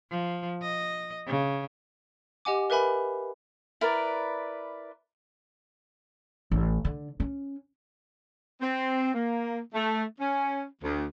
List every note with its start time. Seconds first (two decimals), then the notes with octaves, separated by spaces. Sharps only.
0.11 F3
0.62 D#5
1.27 C#3
2.45 G4 D#5 F#5 G#5 D6
2.70 A#4 B4 E5 G#5 B5
3.81 E4 A#4 B4 D5
6.52 A1
6.85 D3
7.20 C#4
8.61 C4
9.14 A#3
9.74 A3
10.19 C#4
10.83 D2